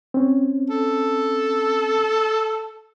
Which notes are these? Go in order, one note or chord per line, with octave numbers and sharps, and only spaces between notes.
C4 C#4
A4